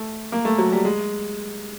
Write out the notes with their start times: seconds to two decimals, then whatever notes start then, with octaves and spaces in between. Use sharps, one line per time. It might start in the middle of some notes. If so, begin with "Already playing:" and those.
Already playing: A3
0.32 A#3
0.45 A3
0.58 F#3
0.72 G3
0.85 G#3